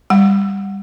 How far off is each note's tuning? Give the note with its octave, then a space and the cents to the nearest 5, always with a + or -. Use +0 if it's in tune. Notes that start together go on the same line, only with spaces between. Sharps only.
G3 +15 F#5 +0